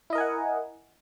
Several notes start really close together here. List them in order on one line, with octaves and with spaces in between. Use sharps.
E4 D#5 A#4 G#5 F#5